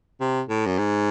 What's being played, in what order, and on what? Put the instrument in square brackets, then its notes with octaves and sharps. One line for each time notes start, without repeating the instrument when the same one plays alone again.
[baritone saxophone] C3
A2
F#2
G#2